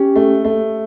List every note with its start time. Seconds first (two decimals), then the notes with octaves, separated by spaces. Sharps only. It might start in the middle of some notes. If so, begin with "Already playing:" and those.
Already playing: C#4 G4
0.16 A3
0.45 A3